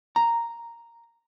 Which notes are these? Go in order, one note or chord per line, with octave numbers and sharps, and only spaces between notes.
A#5